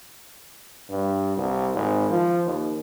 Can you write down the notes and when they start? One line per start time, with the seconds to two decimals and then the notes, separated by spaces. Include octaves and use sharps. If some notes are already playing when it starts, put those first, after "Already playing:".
0.90 G2
1.37 C2
1.75 G#1
2.10 F3
2.46 D#2